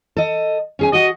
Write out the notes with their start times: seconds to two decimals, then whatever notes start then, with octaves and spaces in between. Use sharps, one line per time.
0.17 A4 D#5
0.79 C#4 G#4 G#5
0.93 F#4 D#5 F#5